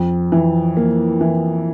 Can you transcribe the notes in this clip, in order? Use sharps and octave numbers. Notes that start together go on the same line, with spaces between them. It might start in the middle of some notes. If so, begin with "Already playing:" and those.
Already playing: F2
E3
A#3
E3